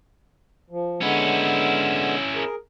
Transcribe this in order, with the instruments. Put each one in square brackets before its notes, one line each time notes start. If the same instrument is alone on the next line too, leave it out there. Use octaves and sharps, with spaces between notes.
[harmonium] F3
[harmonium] D3 G#3 B3 [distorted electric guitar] C#4 E4
[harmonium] G#4 A#4